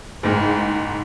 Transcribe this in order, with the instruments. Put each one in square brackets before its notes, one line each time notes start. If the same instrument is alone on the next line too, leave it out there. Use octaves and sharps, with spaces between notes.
[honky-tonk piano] F#1 G#2